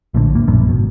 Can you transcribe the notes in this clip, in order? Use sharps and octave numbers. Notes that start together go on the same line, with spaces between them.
A#1 A2 D3
F1 A2 A#3
E1 A#1 F#2
G#1 B2